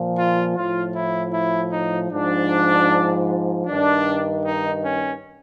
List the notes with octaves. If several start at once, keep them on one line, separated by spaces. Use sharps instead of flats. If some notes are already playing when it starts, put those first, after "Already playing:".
Already playing: A#2 F3
F4
A2 F3 F4
E4
E4
D#4
G#2 F3 D4
G2 D#3 D4
D#4
C#4